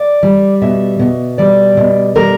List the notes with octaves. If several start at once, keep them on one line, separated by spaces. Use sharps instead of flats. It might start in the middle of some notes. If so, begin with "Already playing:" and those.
Already playing: D5
G3
B2 E5
B2
G3 D5
B2
G3 A#4